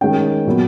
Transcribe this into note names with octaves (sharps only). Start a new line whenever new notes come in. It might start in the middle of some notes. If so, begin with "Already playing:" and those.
D#3 G#3 C#4 G5
A#2 F#3 B3